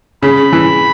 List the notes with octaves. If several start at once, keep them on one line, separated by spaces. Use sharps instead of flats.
C#3 B5
E3